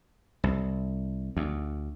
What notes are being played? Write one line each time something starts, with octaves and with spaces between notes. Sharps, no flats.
C2
D2